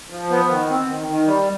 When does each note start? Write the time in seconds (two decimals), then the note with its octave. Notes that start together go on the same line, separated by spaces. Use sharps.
0.10 F3
0.30 B3
0.49 D#3
0.70 C4
0.88 D#3
1.08 D#3
1.27 G3